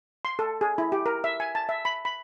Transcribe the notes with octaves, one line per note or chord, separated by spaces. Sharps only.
C6
A4
G#4
E4
G4
A#4
E5
G#5
A5
E5
B5
B5